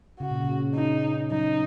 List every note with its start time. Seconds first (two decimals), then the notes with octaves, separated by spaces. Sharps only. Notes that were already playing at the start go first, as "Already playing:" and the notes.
0.20 C#3 F#4
0.31 A#2
0.43 C#3
0.75 D#4
1.31 F#3 D#4